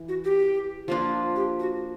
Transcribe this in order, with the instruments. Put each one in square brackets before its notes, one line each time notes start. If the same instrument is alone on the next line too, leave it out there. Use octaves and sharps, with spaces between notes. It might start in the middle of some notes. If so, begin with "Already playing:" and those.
Already playing: [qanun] E3
[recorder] F#4
G4
[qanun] F3 A#3 D4 F4
[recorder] G4
F#4